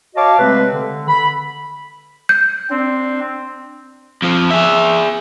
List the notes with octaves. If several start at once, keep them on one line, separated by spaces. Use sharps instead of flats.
F#4 C#5 D#5 F5 A5 D6
C3 G#3 A3 C4 B4
D3
B5
G6
C4 D4
F2 F3
G#4 E5